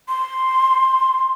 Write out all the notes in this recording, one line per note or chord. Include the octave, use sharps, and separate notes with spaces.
C6